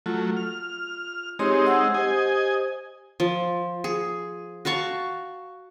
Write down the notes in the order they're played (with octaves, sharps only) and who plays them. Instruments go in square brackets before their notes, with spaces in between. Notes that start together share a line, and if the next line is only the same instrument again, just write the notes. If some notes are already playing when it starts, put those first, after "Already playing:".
[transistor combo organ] F#3 A3 [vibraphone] F4
[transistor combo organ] F6
[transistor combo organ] G#3 C4 D#4 [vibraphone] G4 C#5 C6
[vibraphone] F#5 E6
[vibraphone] G4 C5 [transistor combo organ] D#5 G#5
[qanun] F3
G#4
F#4 F5 A5 C#6